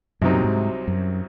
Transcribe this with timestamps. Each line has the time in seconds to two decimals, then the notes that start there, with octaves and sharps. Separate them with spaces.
0.21 C2 F#2 C3 F#3 C4 D#4
0.33 A#2
0.44 G#2
0.88 F#2